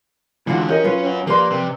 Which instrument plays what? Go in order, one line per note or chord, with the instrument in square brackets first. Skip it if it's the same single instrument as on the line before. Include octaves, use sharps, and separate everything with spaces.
[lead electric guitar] D3 G#3 [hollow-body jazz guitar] E3 F4 F#4
[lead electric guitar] C#4 [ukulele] G4 A#4 D#5
[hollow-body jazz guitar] F#3 F4 [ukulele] B4
[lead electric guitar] C#4 F#4
[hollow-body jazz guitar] F3 C6 [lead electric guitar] A#3 [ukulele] G4 B4 D5
[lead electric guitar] C3